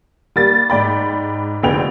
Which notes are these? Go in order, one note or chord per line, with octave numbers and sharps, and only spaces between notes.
G3 A#3 A6
G#2 D5 G5 B5
F1 D3 B3 G#4 G5 F7